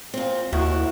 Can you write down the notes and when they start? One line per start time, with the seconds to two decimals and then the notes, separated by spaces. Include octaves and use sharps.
0.14 A#2 C4
0.53 D#2 E4 F#4